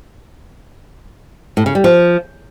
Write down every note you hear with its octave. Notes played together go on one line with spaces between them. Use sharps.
A2
C#3
G3
F3